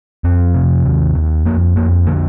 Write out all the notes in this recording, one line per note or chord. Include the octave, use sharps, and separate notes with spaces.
F2 C4
C3
D#2
D#2
F2 A#3
F2 A#3
D3 A#3